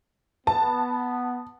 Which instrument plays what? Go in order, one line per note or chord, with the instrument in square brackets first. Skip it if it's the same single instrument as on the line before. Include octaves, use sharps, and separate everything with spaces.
[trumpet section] B3 [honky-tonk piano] A5